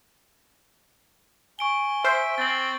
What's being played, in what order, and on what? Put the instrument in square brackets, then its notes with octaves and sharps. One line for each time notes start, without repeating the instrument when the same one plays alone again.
[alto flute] G#5 [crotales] C#6 D7 G7
[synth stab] C5 [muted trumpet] E5 [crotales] F6 G7
[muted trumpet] C4 [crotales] A6 F#7